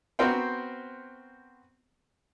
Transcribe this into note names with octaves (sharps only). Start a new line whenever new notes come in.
B3 C4 F#4 A#4 C5 G5